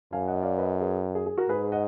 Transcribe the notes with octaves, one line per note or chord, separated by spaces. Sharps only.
F#2 F5 G#5
D#5 F#5
D5 F5
B4 D#5
G#4 B4
G#4
G#4
F#4 A#4
G#2 G#4 B4
D#5 F#5